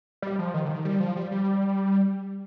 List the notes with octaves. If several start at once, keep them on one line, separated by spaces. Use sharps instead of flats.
G3
F3
D#3
D3
D#3
G3
F3
G3
G3